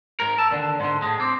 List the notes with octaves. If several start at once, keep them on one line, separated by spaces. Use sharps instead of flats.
G#2 A#4
A5 E6
D#2 D3 D5
G#2 D3 C6
A2 G#3 A5
C4 D6